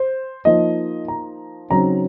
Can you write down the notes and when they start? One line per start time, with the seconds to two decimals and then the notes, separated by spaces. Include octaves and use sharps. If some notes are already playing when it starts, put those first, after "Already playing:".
Already playing: C5
0.45 F3 A#3 D#4 D#5
1.08 A#5
1.70 C#3 F#3 C4 D#4 A#5